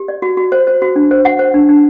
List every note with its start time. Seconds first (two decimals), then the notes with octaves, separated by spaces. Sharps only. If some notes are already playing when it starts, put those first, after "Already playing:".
Already playing: G4
0.08 D5
0.22 F#4
0.37 F#4
0.52 C5
0.67 C5
0.82 F#4
0.96 D4
1.11 C5
1.25 F#5
1.39 C5
1.54 D4
1.69 D4